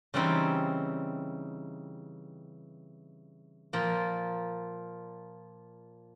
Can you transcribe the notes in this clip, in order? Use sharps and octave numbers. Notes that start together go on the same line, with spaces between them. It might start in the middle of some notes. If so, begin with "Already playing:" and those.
C#3 E3 G3 C4 D#4
A#2 F3 A#3